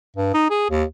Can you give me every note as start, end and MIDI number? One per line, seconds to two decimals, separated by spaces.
0.16 0.30 43
0.34 0.48 63
0.50 0.66 68
0.70 0.84 39